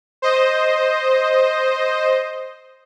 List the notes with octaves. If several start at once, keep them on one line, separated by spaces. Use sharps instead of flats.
C5 D#5